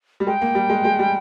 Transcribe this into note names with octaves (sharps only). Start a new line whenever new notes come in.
G3
G#3 G5
A#3
G3
G#3
G#3
G3